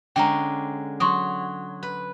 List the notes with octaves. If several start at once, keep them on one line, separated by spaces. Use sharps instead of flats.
D3 G#3 C#4 G5 A#5
F#3 C6 C#6 D#6
B4